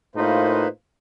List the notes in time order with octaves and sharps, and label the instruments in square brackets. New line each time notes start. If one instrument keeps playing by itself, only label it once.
[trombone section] A2 D#4 F4 [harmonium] A#3 B4 C5